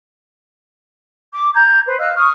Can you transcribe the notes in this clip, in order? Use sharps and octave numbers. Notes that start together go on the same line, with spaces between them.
D6
A#5 G6 G#6
B4 C5
D#5 F5 E6 F#6
C#6 D#6 F6